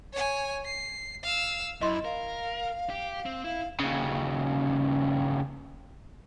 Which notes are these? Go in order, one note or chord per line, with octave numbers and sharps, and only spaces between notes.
C#5 G#5
C7
F5 E6
F#2 E4 D#5 C6
A#4 F5
G4
C4
E4 F5
D#2 C#3